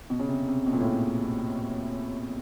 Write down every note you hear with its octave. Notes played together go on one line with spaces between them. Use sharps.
B2
C#3
C3
C3
B2
A#2
A2
A#2